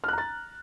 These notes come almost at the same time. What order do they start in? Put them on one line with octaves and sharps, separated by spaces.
F6 F#6 A#5 A6